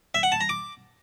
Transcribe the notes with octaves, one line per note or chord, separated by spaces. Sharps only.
E5
F#5
A5
A#5
D6